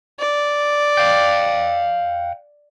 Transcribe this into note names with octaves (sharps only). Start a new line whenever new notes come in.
D5
F5 G5